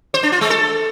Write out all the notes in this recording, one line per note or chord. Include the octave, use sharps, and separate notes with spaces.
C5
D4
F4
G#3
A4